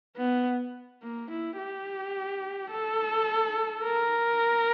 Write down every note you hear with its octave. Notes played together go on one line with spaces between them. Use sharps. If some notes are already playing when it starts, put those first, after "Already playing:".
B3
A#3
E4
G4
A4
A#4